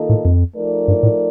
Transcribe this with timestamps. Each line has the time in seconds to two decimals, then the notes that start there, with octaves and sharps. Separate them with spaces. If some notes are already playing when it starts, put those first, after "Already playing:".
Already playing: D#3 A#3 F4 A4 D#5
0.09 A2
0.25 F2
0.56 F3 A3 D#4 A#4 D5
0.88 G2
1.03 A2